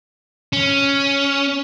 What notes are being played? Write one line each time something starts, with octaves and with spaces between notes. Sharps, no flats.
C#4